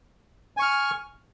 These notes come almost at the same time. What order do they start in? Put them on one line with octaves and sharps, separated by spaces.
G#5 C#6 F6